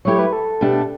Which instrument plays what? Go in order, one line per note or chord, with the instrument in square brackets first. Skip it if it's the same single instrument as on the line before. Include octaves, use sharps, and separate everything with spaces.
[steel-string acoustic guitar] F#3 A3 E4 G4 [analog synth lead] C#5
[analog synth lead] B4
A4
[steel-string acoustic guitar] B2 A3 D4 G4